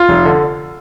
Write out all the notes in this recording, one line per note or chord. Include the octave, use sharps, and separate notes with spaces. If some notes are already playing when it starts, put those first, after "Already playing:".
Already playing: F4
F1
D3